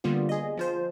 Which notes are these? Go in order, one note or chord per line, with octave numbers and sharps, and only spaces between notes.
D3 G3 A#3 B3 F4
G#4 D#5
F3 F4 C5